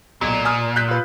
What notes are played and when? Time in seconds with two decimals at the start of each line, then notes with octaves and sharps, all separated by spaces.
0.21 B1 A#2
0.45 G#5 D#6 F6
0.76 F#6 G6 B6
0.88 F4 B4